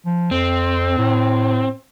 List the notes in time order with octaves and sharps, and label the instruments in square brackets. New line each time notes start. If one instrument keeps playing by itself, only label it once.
[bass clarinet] F3
[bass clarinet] F2 [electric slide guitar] C4
[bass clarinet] A2